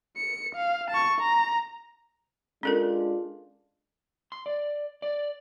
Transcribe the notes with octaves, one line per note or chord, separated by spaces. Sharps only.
C#7
F5
A5 C#6
A#5
G#3 C#4 D4 F4 A4 A#4
C6
D5
D5